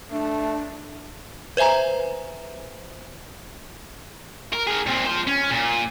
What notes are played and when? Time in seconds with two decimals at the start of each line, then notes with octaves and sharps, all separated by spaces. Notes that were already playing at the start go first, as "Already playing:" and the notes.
0.11 A3 D4
1.57 B4 C5 E5 G#5 A#5
4.53 A#4
4.67 G#4 A#4
4.87 A#2 C4
5.07 F4 C5
5.27 C#4
5.51 A#2